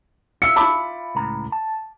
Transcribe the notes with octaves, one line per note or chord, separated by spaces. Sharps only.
F4 E5 C#7
A5 B5 D6
C#2 A2 A#5
A5